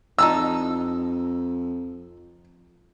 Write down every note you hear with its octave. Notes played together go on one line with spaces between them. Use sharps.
F2 D#4 A5 A#5 E6